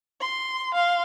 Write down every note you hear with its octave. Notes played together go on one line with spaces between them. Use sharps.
C6
F5 C6